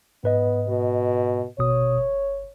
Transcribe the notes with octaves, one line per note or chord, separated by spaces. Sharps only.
G#2 B3 B4 D#5
B2
G#1 B2 C#5 D#6
G1